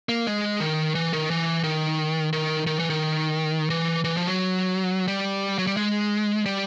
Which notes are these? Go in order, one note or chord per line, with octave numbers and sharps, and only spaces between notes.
A#3
G#3
D#3
E3
D#3
E3
D#3
D#3
D#3
E3
D#3
E3
E3
F3
F#3
G3
F#3
G3
G#3
G3